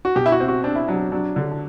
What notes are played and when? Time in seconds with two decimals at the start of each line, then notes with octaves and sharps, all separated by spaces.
0.05 F#4
0.15 B2 G4
0.26 E4
0.32 F#4
0.40 C4
0.48 F#4
0.64 C4 D4
0.76 E4
0.87 F#3 D4
1.12 F#3 D4
1.36 D3
1.52 D4